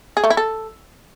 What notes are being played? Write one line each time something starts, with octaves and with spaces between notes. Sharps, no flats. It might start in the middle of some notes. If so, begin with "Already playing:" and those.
G#4
A3
E4
A4